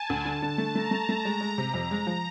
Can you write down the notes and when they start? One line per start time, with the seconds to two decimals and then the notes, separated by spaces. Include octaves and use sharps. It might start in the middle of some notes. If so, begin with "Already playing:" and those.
Already playing: G#5 A5
0.10 D2
0.25 D3 A5
0.42 D3
0.58 A3
0.75 A3 A#5
0.91 A3
1.09 A3
1.25 G#3
1.41 G#3
1.58 C3
1.74 F2 A#5
1.91 G#3
2.07 F3